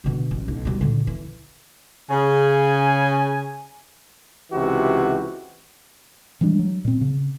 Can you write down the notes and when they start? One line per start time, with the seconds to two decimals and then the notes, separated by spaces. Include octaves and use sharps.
0.04 B2 D3
0.31 A1
0.48 B1
0.65 B2 G3
0.81 A#2 D3
1.07 E3
2.11 C#3 G#5
4.51 C#2 C3 E3 F#4 G4
6.41 E3 G3 G#3 D4
6.59 F#3
6.85 A#2 C4
7.01 C#3